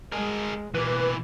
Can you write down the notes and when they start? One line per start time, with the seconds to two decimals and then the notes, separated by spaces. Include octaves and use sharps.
0.12 G#3 G#4 A#4
0.74 B2 E3 A#3 B4